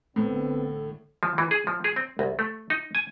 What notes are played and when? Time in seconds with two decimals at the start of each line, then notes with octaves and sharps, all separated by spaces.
0.16 A1 A2 D3 B3 C4 A4
1.23 F3
1.38 E3
1.51 G#4
1.67 F3
1.84 G#4
1.96 C4
2.19 C2
2.39 A3
2.70 D#4
2.95 G#5